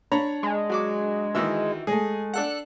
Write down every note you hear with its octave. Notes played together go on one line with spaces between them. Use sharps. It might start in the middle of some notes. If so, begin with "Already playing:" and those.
D4 C#5 A#5 B5
G#3
F#3 F#4 D6
D#3 E3 F#4 E5 E6
G#3 A3 G#4
D4 A4 F#5 F#6